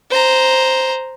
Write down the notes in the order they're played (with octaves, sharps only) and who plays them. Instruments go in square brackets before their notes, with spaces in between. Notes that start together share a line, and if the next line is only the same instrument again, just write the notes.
[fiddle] C5 A#5